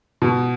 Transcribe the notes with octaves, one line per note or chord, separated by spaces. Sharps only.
B2